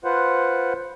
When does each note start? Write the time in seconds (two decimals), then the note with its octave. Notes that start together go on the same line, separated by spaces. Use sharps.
0.04 F4 B4 C5 F#5